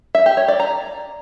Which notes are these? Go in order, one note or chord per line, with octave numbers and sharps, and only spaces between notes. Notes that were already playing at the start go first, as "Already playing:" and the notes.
E5
G4
C#5
D5
A#5